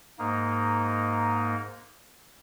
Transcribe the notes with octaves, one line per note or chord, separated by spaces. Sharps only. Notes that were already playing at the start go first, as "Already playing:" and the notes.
G#2 A#3 D#4